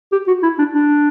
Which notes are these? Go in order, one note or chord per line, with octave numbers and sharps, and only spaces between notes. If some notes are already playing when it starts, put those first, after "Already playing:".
G4
F#4
E4
D4
D4